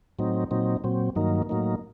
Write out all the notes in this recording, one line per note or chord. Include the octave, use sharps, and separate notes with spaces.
A2 F#3 C4 D#4
A#2 F#3 C4 D#4
A#2 F#3 C4
G2 D#3 F#3 A#3 D#4
A2 F#3 A#3 D#4